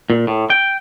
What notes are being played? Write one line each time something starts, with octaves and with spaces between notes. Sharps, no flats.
A#2
A2
G5